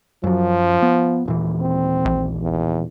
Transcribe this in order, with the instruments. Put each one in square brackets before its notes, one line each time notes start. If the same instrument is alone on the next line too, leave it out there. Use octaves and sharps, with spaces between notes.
[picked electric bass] F#2 F#3 [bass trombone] F3
[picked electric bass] B3
D#1 A#2 E3
[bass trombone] C4
[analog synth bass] A#1
[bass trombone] E2